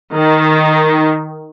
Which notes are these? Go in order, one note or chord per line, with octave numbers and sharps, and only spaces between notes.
D#3